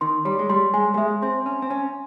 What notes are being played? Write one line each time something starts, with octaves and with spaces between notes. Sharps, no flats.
D#3 C6
G3 C#5
G#3
G3 C6
G#3 G#5
A3
G#3 E5
C4 C6
C#4 G#5
C4
C#4 G#5